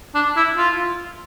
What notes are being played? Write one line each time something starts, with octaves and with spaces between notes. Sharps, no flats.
D4
E4
F4